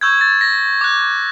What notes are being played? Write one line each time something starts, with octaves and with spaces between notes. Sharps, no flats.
C#6 E6 G6 G#6
G#6
A6
A#6
D6 F#6